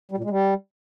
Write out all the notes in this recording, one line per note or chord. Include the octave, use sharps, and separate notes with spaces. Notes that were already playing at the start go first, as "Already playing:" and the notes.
G3
A#2
G#3
G3